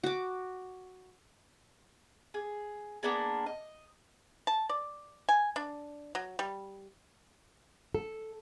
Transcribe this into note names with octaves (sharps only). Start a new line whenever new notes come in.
F#4 D6
G#4
A#3 B3 D4 G#4
D#5
A5
D5
G#5
D4
F#3
G3
A4